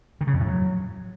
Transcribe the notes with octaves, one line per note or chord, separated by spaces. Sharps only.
D#3
C#3
F2
A2
F#3